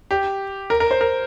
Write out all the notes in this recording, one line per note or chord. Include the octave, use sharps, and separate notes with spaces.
G4
A#4
A#4
C5
A#4